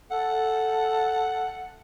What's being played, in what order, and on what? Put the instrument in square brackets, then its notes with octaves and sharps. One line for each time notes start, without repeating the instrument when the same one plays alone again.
[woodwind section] A4 [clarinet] F#5